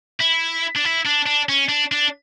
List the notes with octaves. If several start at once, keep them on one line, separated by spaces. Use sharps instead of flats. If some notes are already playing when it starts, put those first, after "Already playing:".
E4
D4
E4
D4
D4
C#4
D4
D4